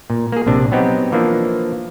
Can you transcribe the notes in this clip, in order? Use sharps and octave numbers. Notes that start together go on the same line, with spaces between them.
A#2
A#3 G#4
A#1 C3 D4
F#3 B3 C4 D#4 G4
E3 F3 A#3 D4